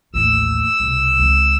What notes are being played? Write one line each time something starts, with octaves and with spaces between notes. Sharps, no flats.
A1 D#2 E6
C2 B2
C#2 C4